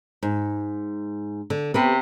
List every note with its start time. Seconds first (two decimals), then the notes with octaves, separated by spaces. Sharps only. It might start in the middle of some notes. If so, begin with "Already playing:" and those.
0.23 G#2
1.50 D3
1.74 C3 B3 G4 B4